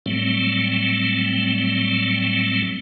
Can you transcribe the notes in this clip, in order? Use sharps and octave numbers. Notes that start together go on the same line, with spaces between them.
A2 F#3 G3 A3 C4